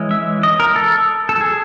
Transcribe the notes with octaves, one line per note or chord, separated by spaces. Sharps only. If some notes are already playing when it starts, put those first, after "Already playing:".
Already playing: E3 G#3 C#4
E5
D#5
A#4
A4
A4
G#4